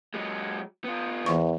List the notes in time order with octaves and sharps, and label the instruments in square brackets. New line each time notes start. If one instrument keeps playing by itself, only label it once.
[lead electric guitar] F#3 G#3
B3 F4
[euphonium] E2 [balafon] E3 C#6